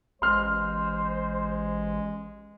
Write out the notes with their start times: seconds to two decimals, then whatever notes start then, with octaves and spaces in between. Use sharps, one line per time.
0.22 A1 G#3 C5 C6 F6